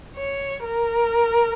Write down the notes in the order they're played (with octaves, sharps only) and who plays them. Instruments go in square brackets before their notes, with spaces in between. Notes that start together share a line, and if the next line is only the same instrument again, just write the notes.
[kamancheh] C#5
A#4